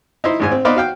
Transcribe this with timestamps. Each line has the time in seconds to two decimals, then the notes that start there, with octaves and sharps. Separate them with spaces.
0.24 D#4 E4 C5
0.40 G#1 G#2 G#5
0.51 C4
0.65 B3 D#4 B4 C5 D5 F5
0.76 F#4 F5 G5